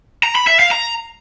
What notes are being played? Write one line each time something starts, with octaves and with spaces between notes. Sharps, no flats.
A#5
B5
E5
F5
A#5